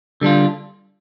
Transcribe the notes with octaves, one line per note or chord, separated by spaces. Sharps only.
D3 G3 D4 F4